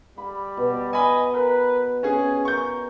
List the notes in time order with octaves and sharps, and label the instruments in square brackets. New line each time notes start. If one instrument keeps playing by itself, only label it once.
[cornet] G3 [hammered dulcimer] B5
[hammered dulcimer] B2
[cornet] D#5 [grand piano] G#5 B5
[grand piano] A#4 [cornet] B4
[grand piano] C#4 G#4 [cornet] G#5
[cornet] A#4 [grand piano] C#6 G6